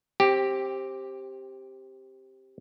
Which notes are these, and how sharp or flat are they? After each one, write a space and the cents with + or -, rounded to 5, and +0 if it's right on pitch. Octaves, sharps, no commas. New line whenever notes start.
C4 +20 G4 +0